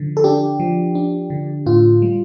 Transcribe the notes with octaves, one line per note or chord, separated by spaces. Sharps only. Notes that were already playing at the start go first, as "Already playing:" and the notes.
Already playing: D3 F3
A4
D4 G4
F3
D4
D3
A2 F4
G3